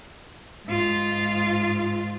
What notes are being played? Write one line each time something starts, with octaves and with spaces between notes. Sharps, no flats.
G#2 F4